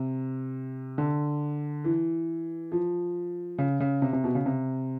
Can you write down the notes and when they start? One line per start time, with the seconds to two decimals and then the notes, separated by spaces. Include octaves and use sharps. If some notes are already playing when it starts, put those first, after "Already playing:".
Already playing: C3
0.98 D3
1.84 E3
2.72 F3
3.58 C#3
3.80 C#3
4.02 C3
4.13 C3
4.24 B2
4.35 C#3
4.46 C3